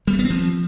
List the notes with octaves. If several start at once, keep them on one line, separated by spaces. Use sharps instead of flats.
G3
A3
B3
C4
F3